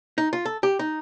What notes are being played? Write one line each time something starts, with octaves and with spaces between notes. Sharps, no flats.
D#4
F4
A4
G4
D#4